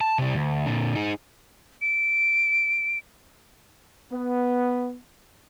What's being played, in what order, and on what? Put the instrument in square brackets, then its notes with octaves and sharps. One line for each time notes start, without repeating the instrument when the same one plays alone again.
[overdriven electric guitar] A5
C3 G3
D2
A#2 D3
D#4 G#4
[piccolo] D7
[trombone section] B3